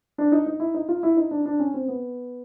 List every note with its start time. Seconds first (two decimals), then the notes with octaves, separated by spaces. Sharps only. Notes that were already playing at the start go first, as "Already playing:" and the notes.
0.18 D4
0.32 D#4
0.46 D#4
0.60 E4
0.74 D#4
0.89 F4
1.03 E4
1.17 D#4
1.31 D4
1.46 D4
1.60 C#4
1.74 C4
1.88 B3